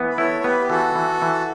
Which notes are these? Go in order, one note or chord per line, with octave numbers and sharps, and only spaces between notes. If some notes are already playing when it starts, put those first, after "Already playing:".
Already playing: E3 B3
B4
E4 A4 C#5
C#5
B3 G4 B4
G4
E3 F#4 A4
E3
E3